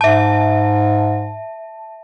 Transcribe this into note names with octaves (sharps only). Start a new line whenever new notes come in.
G#2 E5 A5